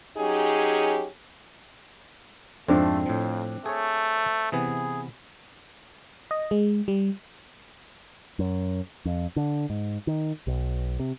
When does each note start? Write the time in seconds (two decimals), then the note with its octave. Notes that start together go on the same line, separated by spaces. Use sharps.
0.17 F#3 C#4 D#4 G4 G#4
2.68 F2 G#2 F3 A3 C4 D4 C5
3.06 F2 A2 F3
3.66 A3 G#4 C#5
4.52 C3 E3 B3 G#4
6.31 D#5
6.51 G#3
6.88 G3
8.39 F#2
9.05 F2
9.36 D3
9.70 G#2
10.07 D#3
10.47 B1
10.99 C3